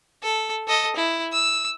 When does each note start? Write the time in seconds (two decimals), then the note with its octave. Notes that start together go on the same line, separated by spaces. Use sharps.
0.23 A4
0.67 A4 D#5
0.96 E4
1.32 E6